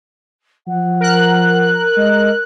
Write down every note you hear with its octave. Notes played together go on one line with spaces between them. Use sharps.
F3 F#5
A#4 F#6
G#3 D#5